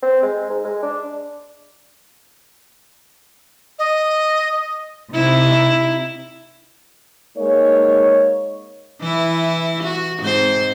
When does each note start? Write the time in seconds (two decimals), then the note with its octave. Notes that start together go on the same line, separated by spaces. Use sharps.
0.02 C4
0.23 G#3
0.50 G#2
0.65 G#3
0.83 D4
3.79 D#5
5.13 C3 D#4 E4
7.38 G#3 A#3 D#4 C#5
9.01 E3 E4
9.83 F#4
10.20 G#2 C4 C5